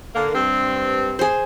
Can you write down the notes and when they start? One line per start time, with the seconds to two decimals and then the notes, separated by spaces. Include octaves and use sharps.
0.15 D3 A#3
0.35 G2 C4
1.19 G#4 C5